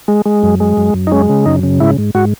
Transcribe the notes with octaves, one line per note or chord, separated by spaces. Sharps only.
G#3
G#3
F#2
G#3
F#2
F#2
D#4
G#3 C#4
C#3
F#2 D#4
C#3
G#2 E4
G#2
G#2 F#4